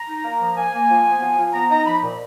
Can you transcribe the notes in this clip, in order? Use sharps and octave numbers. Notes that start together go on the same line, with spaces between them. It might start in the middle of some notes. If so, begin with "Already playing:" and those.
Already playing: A#5
D#4
A#3
F3
A#3 G#5
A#3
F3
B3
F3
F3
B3 A#5
D#4 A#5
F3 B5
A#2